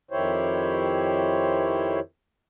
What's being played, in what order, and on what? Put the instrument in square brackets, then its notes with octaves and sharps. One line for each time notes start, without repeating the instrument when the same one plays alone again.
[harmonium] F2 D#3 E4 G4 C5 C#5